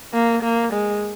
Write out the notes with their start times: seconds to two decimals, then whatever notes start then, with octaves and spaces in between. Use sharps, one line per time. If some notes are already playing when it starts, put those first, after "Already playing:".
0.14 A#3
0.43 A#3
0.73 G#3